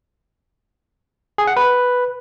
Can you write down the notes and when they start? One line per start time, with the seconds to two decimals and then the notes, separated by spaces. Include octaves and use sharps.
1.38 G#4
1.47 F#5
1.57 B4